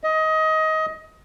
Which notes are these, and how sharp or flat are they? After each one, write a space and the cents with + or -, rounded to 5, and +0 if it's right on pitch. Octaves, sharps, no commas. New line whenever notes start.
D#5 +20